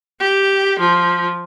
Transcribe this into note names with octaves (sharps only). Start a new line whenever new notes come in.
G4
F3